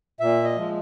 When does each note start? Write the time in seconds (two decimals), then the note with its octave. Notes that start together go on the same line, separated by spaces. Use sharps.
0.20 A#2 E5
0.44 D#5
0.56 F3 G#3